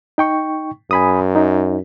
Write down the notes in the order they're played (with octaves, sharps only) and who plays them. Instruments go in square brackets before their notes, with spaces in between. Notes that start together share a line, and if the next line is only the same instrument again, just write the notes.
[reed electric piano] D#4 G5 C#6
[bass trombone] F#2 [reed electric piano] G#5 B5 D#6
[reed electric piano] D#4